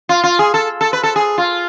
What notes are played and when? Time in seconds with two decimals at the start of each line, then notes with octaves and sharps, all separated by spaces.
0.09 F4
0.23 F4
0.39 G#4
0.54 A4
0.81 A4
0.93 B4
1.03 A4
1.16 G#4
1.38 F4